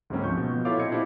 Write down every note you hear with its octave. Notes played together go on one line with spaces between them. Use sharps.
D2 G#2 F#3 A#3 C4 C#4
F3 C#6 G6
B2
E4 F4 A4 C#5 F5 D6
A#2 C4 E4 D#5 G#6 C#7
D4 E4 F4 G4 C5